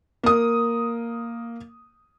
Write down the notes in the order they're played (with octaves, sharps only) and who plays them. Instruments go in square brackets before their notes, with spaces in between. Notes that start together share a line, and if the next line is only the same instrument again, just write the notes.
[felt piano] A#3 D#6